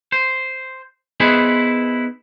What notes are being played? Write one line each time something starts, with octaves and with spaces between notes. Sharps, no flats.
C5
B3 D#4 E4 G#4 B4 C5